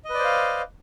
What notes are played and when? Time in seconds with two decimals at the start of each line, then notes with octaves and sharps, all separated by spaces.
0.05 D#5
0.10 B4
0.15 D5
0.19 C5
0.24 F5